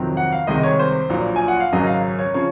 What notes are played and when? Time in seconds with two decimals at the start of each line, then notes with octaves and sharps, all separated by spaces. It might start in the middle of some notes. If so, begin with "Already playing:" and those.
Already playing: F2 C3 D#3 F#3 C4
0.17 F#5
0.32 F5
0.47 C2 C3 D#3 G#3 D#5
0.63 C#5
0.79 C5
1.10 A#1 A#2 F#3
1.36 G#5
1.48 F#5
1.60 F5
1.72 G#1 F#2 C#3 F#3 D#5
1.87 F5
2.19 C#5
2.34 C#3 F3 C#5